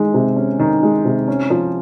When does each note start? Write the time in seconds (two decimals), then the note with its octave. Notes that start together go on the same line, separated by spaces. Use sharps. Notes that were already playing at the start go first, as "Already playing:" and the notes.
Already playing: D#3 G#3
0.14 C3
0.36 C#4
0.59 D#3
0.83 G#3
1.05 C3
1.28 C#4
1.50 F3